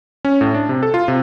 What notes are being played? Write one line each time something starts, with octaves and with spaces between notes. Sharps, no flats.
C#4
A2
D4
C3
A4
F4
C3